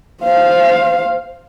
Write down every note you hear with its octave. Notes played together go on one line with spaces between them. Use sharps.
C5 F5